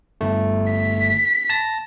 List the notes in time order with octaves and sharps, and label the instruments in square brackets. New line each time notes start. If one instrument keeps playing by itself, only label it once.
[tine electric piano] G1 A3
[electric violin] B6
[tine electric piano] A5 A#6